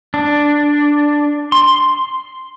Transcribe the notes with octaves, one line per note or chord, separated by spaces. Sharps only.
D4
C6